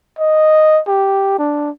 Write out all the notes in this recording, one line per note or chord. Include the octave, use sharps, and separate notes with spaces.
D#5
G4
D4